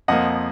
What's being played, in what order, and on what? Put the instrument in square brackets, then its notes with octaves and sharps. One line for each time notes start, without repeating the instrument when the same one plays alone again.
[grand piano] F2 F3 A#3 D#5 F#5